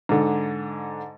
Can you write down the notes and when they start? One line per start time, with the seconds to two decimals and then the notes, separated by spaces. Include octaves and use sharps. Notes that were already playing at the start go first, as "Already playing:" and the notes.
0.09 G#2 D3